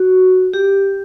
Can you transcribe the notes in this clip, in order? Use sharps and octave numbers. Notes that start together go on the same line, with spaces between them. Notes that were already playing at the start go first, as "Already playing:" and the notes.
Already playing: F#4
G4